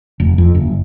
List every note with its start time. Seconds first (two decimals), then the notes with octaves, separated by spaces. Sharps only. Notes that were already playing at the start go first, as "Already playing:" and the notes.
0.20 F1
0.38 F2
0.55 F#1